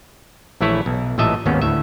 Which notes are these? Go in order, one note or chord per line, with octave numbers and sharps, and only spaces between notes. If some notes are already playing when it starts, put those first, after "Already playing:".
A#1 E3 A3 E4 B4 C#5
B1
A1 A#2 E3 D#5 E5 A5
G#1 D#2 G#2 A#3 B3 C#4
D2 A2 E5